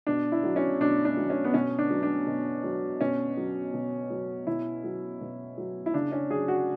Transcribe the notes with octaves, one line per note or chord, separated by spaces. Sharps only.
B2 D4
E4
F#3
C#4
B2 D4
D4
F#3
C#4
B3
B2 C#4
D4
F#3
D4
B2
F#3
B2 C#4
F#3
B2
F#3
B2 E4
F#3
B2
F#3
E4
C#3 D4
C#4
F#3 G#4
F#4